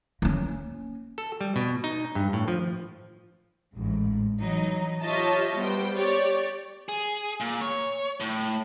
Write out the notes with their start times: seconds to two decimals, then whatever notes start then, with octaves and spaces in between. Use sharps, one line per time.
0.22 A#3 C#4
1.18 A4
1.41 G3
1.56 B2
1.84 D#4
2.15 G2
2.33 A2
2.48 F3
3.76 A1 G#2
4.41 E3 F#3 D#4
5.02 F4 G4 C#5 D#5 E5 A5
5.58 G3 B3 C5 G5
5.94 G4 C#5 D5
6.89 G#4
7.40 A#2
7.61 C#5
8.20 A2